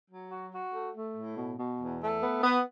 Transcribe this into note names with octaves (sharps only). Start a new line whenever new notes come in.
F#3
F#4
F#4
A3
A3
A2
B2
B2
E2
A3
B3
B3